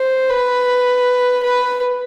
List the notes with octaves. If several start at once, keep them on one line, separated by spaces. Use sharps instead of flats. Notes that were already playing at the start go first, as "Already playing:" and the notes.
Already playing: C5
B4
B4